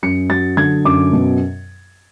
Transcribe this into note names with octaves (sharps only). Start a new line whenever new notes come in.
F#2 C#7
F#3 A6
D3 G#6
F#2 D6
B2